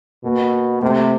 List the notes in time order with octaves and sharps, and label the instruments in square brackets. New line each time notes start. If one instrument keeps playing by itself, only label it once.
[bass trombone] B2 [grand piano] A#3
[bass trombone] C3 [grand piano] A3